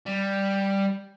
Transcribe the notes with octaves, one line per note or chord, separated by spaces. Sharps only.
G3